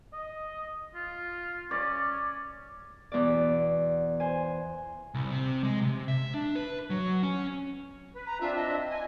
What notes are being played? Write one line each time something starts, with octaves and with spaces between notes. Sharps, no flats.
D#5
F4
C#4 D5
E2 B2 D5
C5 G#5
C2
C3
G#3
C3
E5
D4
B4
F#3
C#4
B4
A#5
C4 D4 F4 E5
D#5
G#5